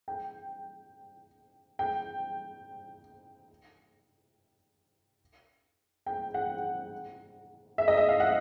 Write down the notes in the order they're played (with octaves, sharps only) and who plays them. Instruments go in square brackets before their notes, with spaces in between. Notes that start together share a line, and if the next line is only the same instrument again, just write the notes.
[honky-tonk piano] G5
G5
G5
F#5
E5
D#5
E5
F5
F#5